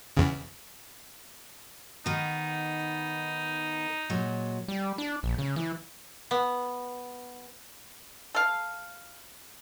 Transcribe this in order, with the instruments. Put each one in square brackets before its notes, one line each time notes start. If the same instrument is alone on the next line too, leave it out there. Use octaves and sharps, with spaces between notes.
[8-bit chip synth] E2 C#3
[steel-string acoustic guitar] D#3 B3 [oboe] D#4
[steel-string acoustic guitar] A#2 F#3 G#3
[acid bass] G3
D4
A#1
C#3
E3
[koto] B3
[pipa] A4 F5